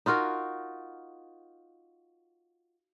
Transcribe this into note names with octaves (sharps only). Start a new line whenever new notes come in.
D#4 F4 F#4 A#4